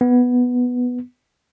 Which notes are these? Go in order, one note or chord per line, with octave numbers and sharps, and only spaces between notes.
B3